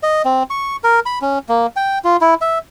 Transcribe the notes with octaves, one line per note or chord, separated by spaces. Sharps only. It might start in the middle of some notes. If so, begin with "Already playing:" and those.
D#5
C4
C#6
A#4
B5
C#4
A#3
G5
F4
E4
E5